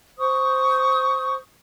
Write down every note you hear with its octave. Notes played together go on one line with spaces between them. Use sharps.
C5 C#6 D#6